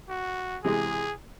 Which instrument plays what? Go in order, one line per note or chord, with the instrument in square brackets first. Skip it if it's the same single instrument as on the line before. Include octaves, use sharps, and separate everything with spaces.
[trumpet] F#4
[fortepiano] C3 E3 G#3 [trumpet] G#4